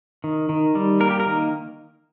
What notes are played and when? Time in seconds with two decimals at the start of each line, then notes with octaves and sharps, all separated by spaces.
0.24 D#3
0.49 D#3
0.75 G3
1.00 A#3 A#4
1.10 G4
1.20 A#4
1.26 D#3